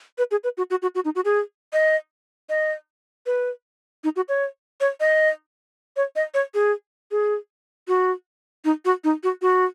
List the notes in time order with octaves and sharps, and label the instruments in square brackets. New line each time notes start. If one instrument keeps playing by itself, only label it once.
[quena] B4
G#4
B4
F#4
F#4
F#4
F#4
D#4
F#4
G#4
D#5
D#5
B4
D#4
F#4
C#5
C#5
D#5
C#5
D#5
C#5
G#4
G#4
F#4
D#4
F#4
D#4
F#4
F#4